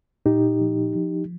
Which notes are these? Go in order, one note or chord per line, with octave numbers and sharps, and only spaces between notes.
A#2 D#4 G4
F3
F3